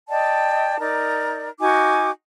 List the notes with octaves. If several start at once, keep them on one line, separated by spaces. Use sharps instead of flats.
D5 D#5 G5 A5
D#4 A#4 D5
D#4 F#4 G#5 D6